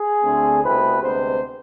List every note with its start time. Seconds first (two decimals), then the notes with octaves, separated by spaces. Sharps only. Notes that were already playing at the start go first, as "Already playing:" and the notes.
Already playing: G#4
0.23 D2 D3 A3 C4
0.62 C2 B2 A3 C4 B4
1.01 D2 C3 G#3 B3 C5